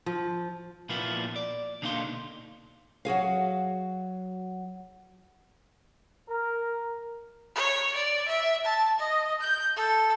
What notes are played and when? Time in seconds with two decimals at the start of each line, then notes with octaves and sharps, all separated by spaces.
0.06 F3
0.89 A#2 F3 A#3 B3 E4 F4
1.36 D5
1.82 B2 D3 A#3 D#4 F5 C6
3.05 F#3 F#4 G#4 F5
6.28 A#4
7.55 C#5
7.95 D5
8.28 E5
8.65 A5
8.99 D#5
9.41 G6
9.76 A4